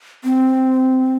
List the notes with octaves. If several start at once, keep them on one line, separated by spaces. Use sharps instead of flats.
C4